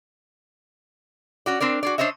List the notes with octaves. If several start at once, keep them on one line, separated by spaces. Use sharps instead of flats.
C#4 F#4 D5
C4 D4 A#4 D5
F#4 G#4 D5
D4 C5 C#5 D#5 E5